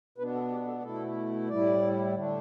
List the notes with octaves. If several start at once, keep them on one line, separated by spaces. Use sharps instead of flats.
B2 B3 D4 B4
A4
G4
A4
B2 A3 E4 A4
A2 G3 E4 D5
D3 A3 D4